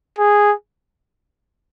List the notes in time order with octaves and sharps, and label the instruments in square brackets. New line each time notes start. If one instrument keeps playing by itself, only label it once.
[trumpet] G#4